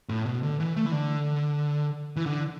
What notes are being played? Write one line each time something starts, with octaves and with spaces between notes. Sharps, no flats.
A2
B2
D3
E3
A3
E3
D3
E3
D3